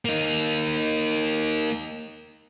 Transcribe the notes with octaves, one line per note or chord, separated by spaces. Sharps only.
A#3 D#4